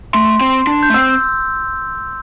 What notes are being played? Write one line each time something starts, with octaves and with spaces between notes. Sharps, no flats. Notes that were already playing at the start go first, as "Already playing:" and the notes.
A3 C6
C4
D4
G6
A3
C4 E6